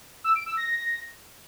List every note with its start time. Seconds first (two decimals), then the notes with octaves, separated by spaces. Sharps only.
0.24 E6
0.35 D7
0.46 E6
0.57 A#6